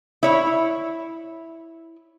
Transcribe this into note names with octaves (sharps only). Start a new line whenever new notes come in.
E4 C#5